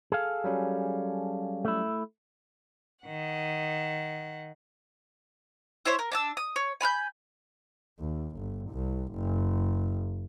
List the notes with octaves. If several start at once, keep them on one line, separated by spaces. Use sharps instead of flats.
G#4 A4 F5
F#3 G3 C#4
A3 E4
D#3 F#5
E4 C5 C#5 E5
A#4
D4 A5 E6
D#6
C#5
G#5 B5 F6 G6
D#2
G1
C2
F#1